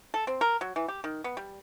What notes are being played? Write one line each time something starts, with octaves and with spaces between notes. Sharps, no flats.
A4
C4
A#4
F#3
E3
G4
D#3
B3
G3